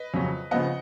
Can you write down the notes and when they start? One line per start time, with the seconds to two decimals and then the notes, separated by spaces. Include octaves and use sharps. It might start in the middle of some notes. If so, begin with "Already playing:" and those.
Already playing: B4 D#5
0.14 F2 C#3 F#3 C#4
0.51 C#3 F3 B3 D#5 F#5